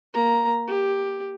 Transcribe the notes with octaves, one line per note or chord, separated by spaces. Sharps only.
A#3 A#5
G4